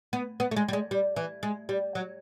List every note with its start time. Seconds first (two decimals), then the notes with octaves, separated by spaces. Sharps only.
0.13 B3
0.40 B3
0.51 A3
0.56 G#3
0.68 G3
0.73 G#3
0.91 G3
1.16 E3
1.43 G#3
1.69 G3
1.95 F#3